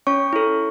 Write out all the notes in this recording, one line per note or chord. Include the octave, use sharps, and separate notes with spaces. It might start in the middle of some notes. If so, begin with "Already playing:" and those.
C#4 C#5 C#6
E4 A4